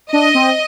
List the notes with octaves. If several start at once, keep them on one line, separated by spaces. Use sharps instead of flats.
D4 D#5
C4